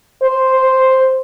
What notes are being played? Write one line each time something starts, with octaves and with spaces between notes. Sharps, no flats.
C5